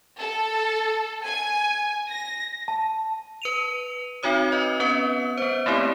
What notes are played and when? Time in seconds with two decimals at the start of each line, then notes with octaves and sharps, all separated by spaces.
0.19 A4
1.26 G#5
2.10 A#6
2.68 A5
3.42 B4 D#7 F7
4.23 C4 D#4 F#4 C#5 D#6
4.52 B4 D#5
4.80 B3 C#4 B4
5.38 B3 C5
5.66 A3 A#3 C4 E4 G4